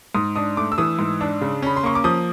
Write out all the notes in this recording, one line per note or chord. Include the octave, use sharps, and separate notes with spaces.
G#2 D#6
D4 D#6
A3 D6
E6
E3 D#6
G#2
D4
C#3
C#4 B5
C6
A#3 C#6
D6
F3 D#6